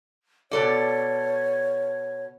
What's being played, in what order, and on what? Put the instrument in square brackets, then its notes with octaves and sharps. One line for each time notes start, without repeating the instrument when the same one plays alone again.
[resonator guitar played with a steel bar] B2 A4 D5 [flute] C#5